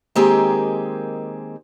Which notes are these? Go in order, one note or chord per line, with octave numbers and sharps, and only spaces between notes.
D#3 G#3 A#3 C4 G4 G#4